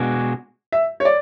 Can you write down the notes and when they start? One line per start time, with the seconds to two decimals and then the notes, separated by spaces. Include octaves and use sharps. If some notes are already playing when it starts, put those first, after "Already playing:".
Already playing: B2 G#3 D4 F#4
0.72 E5
1.00 C#5
1.05 D5